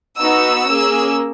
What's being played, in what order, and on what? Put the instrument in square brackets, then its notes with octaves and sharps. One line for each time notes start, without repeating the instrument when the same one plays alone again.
[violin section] B3 D#4 F#4 E6
A#3 C#4 G#4